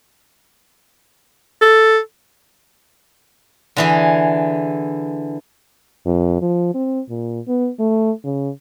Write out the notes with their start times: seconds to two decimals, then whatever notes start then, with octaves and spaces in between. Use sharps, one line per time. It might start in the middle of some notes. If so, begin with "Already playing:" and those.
1.61 A4
3.77 D3 E3 G#4
6.06 F2
6.42 F3
6.75 C4
7.10 A#2
7.48 B3
7.79 A3
8.25 C#3